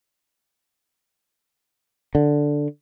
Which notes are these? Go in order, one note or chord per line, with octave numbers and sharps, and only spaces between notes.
D3